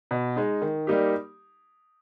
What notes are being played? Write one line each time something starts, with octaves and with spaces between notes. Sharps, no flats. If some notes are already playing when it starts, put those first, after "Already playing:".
B2
G#3 D#4
D#3
G3 A#3 D#4 G4